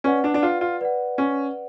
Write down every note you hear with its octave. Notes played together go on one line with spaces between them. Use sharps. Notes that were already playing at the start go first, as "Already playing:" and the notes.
C#4 B4 D5 F#5
D4
D4
F4
F4
B4 D5 F#5
C#4